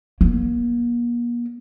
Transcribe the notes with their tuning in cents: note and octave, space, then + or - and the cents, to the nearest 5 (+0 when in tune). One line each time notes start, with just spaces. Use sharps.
A#3 +40